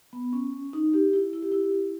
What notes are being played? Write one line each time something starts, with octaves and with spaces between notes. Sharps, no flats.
B3
C#4
D#4
G4
E4
E4
G4
E4
G4
E4